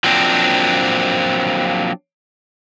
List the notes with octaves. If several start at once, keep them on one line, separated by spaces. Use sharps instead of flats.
F3 F#3 A#3 C4 D4